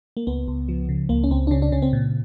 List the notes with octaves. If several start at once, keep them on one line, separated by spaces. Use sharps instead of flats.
A#3
C#2 B3
C#2
F3
C#3
C#2 A#3
C#4
C#2 C4
D4
C#3 C#4
D4
C#3 C#4
C4
A#2